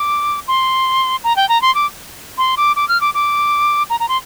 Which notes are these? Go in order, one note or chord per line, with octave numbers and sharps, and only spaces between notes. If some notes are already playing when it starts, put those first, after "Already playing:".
Already playing: D6
C6
A#5
G5
A#5
C6
D6
C6
D6
D6
F6
D6
D6
A#5
A#5
C6